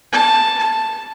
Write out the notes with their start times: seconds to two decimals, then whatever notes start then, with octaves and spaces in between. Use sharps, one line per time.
0.12 A5
0.58 A5